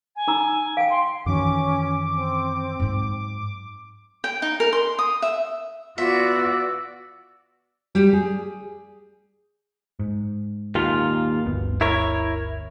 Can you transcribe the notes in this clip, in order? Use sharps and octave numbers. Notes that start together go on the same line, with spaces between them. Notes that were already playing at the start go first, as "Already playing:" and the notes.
G#5
D#4 A#5 E6
F5 G5 D7
C6
F#2 D#3 E3 C#4 D6
C4
G#2 F#3
G5
D#4
A#4
C6
D#6
E5
B3 F4 F#4 D5 E5
G3
G#4
G#2
D#2 A#2 F4
G1 D2 B3
E4 A#4 C#5